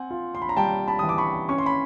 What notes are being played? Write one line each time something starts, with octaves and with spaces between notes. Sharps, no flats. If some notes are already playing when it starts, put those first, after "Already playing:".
Already playing: C4 F#5 G#5
F4
C6
B5
A#5
G3 G5 A5
A5 B5
E3 D#6
D6
B5 C#6
C#4 C#6
C6
B5